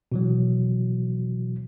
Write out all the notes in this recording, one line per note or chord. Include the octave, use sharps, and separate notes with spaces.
B2 E3 F#3